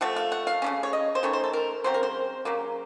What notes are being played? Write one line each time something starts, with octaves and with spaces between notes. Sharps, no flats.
F3 A3 F#5
F5
F#5
F5
C#3 A3 C#4
C#5
D#5
C5
D#3 A3 C#4 C#5
C5
A4
A#4
C#3 F#3 C4 C5
A#4
C5
C#3 F#3 A#3